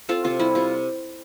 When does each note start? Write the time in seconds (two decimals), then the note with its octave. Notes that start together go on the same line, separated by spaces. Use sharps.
0.09 C4 F4 A4
0.24 C3 F4
0.39 G3 E4
0.55 C3 F4